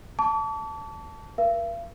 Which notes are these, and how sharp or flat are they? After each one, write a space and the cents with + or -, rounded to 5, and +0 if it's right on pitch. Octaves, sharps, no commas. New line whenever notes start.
A5 +0 D6 -45
A#4 +40 F5 -45